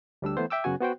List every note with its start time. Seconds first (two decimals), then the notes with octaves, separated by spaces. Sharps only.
0.22 D2 G3 D4 E6
0.37 E3 A3 B3 C5
0.50 E5 G5 D6 E6
0.64 F#2 C#3 B3 F#4 G#5
0.81 B3 F#4 C5 G5